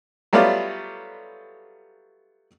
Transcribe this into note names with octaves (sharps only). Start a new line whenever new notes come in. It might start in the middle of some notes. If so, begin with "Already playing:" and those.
F#3 G3 A3 B3 F4 D5